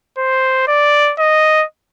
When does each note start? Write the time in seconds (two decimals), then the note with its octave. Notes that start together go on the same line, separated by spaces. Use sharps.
0.18 C5
0.68 D5
1.19 D#5